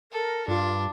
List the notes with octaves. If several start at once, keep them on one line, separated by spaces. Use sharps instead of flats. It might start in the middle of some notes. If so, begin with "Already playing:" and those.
A4 A#4
G2 D4 F4